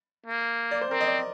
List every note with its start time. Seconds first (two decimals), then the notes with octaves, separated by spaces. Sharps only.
0.26 A#3
0.71 D5
0.81 C5
0.91 C4 A#4
1.01 D#5
1.07 D5